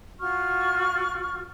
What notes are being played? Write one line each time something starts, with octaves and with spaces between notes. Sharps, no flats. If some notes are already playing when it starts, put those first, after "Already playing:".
F4 F#4 C#6 F6